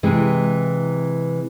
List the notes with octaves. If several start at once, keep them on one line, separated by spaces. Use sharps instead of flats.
C3 E3 G#3